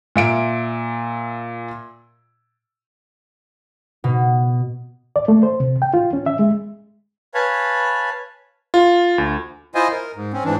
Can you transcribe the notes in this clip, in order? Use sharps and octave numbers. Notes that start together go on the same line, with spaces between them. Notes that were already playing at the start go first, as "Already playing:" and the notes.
A#2 E5 D7
B2
D5
A3
C5
C3
G5
F4
C#4
E5
G#3
B4 C#5 F5 G#5 A5 B5
F4
D2
E4 F4 C5 D#5 G#5
A#4
G#2
C4 C#4
G#2 E3 D4